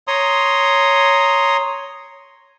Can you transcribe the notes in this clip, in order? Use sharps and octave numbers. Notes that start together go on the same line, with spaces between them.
C#5 A#5 C6 D#6